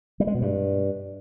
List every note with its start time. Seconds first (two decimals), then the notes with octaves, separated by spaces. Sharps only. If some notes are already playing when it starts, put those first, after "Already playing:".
0.20 G3
0.27 G#3
0.34 B2
0.42 G2